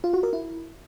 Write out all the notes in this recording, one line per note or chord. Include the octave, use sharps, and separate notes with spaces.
F4
F#4
A#4
E4